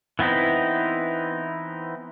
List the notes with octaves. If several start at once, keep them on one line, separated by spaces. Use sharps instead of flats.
E3 B3 C4 D#4 E4